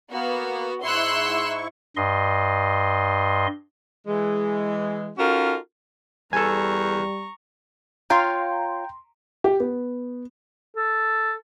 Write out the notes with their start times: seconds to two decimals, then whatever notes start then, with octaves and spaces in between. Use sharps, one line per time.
0.11 A#3 B3 F#4
0.83 G#2 E4 C6 C#6 E6 F#6
1.96 G2 D#5 C6
4.07 E3 G#3
5.18 C#4 D#4 F4 F#4 A4 A#4
6.33 E2 G3 A4 G#5 A#5 C#6
8.10 F4 C#5 F5 G5 A#5 C6
9.44 G4
9.60 B3
10.76 A4